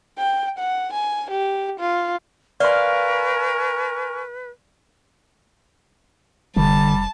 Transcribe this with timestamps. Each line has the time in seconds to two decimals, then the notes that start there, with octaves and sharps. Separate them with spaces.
0.19 G5
0.58 F#5
0.93 G#5
1.31 G4
1.80 F4
2.60 A#4 B4 D5 F5 G#5 C6 C#6
6.56 F1 D3 G3 A5